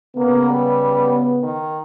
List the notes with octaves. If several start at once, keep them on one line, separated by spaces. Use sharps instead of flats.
C#3 A#3 B3
G3
D#3